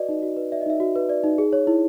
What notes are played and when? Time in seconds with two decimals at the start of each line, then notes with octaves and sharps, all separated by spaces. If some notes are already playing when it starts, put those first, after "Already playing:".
Already playing: F#4 B4 D5 D#5
0.09 D#4
0.22 F#4
0.37 B4
0.52 D5 E5
0.61 D#5
0.66 D#4 E5
0.80 F#4
0.96 B4
1.09 D5
1.24 D#4
1.38 G#4
1.53 C#5
1.67 E4